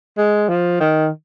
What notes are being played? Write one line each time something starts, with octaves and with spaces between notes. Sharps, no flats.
G#3
F3
D#3